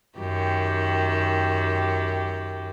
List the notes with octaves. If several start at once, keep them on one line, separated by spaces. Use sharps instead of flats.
F#2 D#3 G4